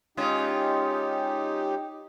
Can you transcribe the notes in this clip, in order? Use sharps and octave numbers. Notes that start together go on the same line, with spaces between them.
G#3 C#4 D#4 F4 G4